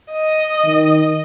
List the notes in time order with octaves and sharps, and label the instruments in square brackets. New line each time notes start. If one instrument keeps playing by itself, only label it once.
[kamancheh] D#5
[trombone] D#3